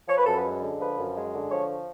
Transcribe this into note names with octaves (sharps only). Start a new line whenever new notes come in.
F3 C#5
B4
F#2 A4
B4
G#3
D3
F3 B4
F#2
G#3
D3
F3 C#5